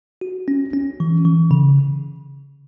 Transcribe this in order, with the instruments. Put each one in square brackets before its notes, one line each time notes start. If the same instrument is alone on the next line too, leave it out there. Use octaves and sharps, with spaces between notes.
[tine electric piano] F#4
C#4
C#4
E3
E3
C#3